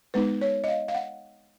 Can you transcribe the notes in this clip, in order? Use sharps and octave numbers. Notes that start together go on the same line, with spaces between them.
G#3 B3 D#4 B4
C#5
D#5
F5
F5
F#5